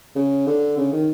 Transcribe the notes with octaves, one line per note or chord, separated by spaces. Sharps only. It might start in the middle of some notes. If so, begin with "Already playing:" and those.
C#3
D3
C#3
D#3